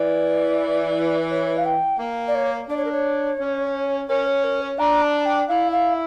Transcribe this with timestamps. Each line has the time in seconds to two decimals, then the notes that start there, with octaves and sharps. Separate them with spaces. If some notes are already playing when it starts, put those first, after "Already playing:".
Already playing: E3 D5
1.30 C#5
1.57 F5
1.65 G5
1.99 A#3
2.28 D5
2.35 C#5
2.69 D4 D5
2.77 C#5
2.85 A#4
2.92 C#5
3.39 C#4
4.09 C#4 A#4
4.26 C#5
4.44 A#4
4.61 C#5
4.79 D4 A#5
5.02 A5
5.25 G5
5.48 E4 F5
5.72 F5